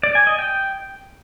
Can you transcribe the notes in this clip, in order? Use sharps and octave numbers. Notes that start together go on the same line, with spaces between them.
D5
G#5
D#5
G5